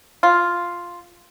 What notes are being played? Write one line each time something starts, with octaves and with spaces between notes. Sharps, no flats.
F4